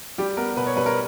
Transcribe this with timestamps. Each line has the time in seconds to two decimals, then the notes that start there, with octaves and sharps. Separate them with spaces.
0.18 G3 G4
0.37 B3 A#4
0.57 B2 B4
0.67 C#5
0.76 G3 B4
0.86 A#4